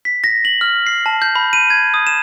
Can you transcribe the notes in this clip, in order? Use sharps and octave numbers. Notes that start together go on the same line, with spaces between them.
B6
A#6
F#7
F6
C7
A5
G6
B5
D#7
G#6
D#6
E7